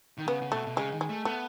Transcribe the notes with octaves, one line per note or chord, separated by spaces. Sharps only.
D#3
C#3 B3
C#3
B2 A3
B2
C#3 G#3
D#3
G#3
A3
A3 B3